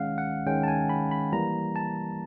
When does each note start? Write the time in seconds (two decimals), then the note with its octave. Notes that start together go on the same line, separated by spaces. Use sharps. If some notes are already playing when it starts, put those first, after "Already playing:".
Already playing: D#3 G#3 C#4 F5 F#5
0.18 F#5
0.46 D#3 G#3 C#4 G5
0.63 A5
0.68 G#5
0.89 B5
1.11 B5
1.33 E3 G3 A#3 A#5
1.76 A5